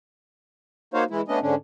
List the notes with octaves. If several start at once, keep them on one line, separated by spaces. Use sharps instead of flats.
A#3 D#4 F#4 C5 C#5 F5
E3 G#3 E4
A3 B3 C#4 D4 D#5
G#2 D3 C#4 D4